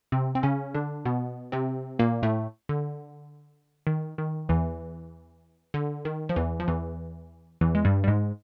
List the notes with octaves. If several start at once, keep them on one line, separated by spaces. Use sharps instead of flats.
C3 C4
C4
C#3 C#4
D3 D4
B2 B3
C3 C4
A#2 A#3
A2 A3
D3
D#3
D#3
E2 E3
D3
D#3
F3
E2 E3
F3
E2 E3
E2 E3
G#3
G2 G3
G3
G#2 G#3